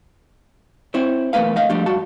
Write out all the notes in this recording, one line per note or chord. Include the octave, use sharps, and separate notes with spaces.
C4 E4 C5 C#5
B1 E2 A3 A#3 B4 F5
A3 D#5 F5
F3 G3 A3 D4
G2 F#4 A5